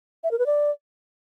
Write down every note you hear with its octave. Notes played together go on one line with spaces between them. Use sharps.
E5
A#4
B4
D5